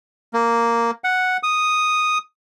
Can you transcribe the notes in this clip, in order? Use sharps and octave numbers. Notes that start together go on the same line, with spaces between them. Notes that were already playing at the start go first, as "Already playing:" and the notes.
A#3
F#5
D#6